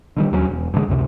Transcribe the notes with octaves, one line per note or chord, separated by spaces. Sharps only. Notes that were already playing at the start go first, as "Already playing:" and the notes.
D3 D#3 G3
D#2 F#3 G#3 C#4
E1
G2 D3 G#3
C#2 F#2 C3